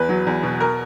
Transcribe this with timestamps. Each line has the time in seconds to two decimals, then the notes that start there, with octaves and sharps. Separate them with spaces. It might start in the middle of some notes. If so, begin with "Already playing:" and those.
Already playing: E2 B4
0.09 F#3
0.26 E2
0.43 B2
0.60 A#4